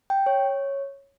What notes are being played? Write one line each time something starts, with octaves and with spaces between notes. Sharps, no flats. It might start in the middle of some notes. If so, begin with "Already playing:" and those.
G5
C#5